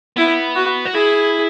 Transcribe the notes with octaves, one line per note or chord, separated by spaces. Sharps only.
B3 E4
F#4
F#4
E4 G#4